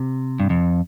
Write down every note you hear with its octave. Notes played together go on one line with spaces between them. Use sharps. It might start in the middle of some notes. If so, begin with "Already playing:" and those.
Already playing: C3
G2
F2